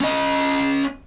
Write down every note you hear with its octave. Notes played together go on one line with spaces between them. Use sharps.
C#4 D#5